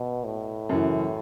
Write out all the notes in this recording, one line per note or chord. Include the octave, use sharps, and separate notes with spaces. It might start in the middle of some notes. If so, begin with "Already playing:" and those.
Already playing: B2
A2
F#2 C#3 E3